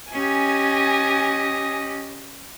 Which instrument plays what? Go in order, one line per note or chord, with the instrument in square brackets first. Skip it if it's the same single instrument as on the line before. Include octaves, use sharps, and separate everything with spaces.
[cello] C#4 G4 [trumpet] D#5 [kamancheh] G#5